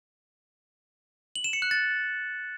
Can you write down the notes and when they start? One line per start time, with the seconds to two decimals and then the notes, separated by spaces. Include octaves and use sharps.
1.36 F#7
1.44 E7
1.53 C#7
1.62 F#6
1.71 A6